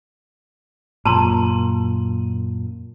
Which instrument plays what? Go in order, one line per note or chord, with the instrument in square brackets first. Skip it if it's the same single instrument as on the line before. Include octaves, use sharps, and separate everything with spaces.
[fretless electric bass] F#2 A#2 [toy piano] A5 A#5 C6